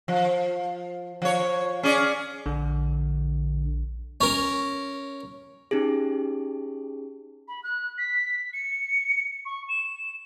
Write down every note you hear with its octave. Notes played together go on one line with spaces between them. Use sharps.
F3
F3 C#5
C#4 G#4 D5
A#1 D3
C#4 A#4
C#4 D#4 G4 G#4
B5
F#6
B6
C#7
C#6
E7